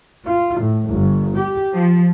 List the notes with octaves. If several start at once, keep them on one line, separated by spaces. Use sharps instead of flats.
F4
A2
G1
G4
F3